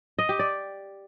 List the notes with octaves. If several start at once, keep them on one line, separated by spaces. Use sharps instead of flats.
D#5
G4
D5